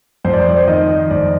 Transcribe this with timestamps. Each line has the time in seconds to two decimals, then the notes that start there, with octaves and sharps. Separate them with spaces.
0.24 F2 C5
0.33 D5
0.41 C5
0.49 D5
0.57 C5
0.67 D#3 D#5
1.11 F2 D5